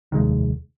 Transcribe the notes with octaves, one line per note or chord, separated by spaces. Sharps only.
F1 D#2 D#3 G#3